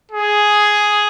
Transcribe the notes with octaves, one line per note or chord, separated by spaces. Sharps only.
G#4